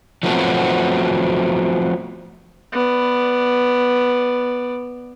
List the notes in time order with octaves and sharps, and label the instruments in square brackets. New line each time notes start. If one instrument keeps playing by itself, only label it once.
[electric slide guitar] F3 F#3 A3 B3 C4 F#4
[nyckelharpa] B3 D5